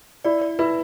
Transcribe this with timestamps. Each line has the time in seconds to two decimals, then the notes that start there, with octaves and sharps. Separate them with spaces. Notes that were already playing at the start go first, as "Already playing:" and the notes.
0.25 E4 D5
0.42 D5
0.59 E4 B4